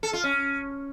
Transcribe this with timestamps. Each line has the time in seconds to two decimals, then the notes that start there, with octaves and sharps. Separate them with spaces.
0.03 A4
0.13 F4
0.24 C#4